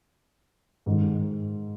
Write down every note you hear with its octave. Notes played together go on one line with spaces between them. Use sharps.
G#2 D#3 G#3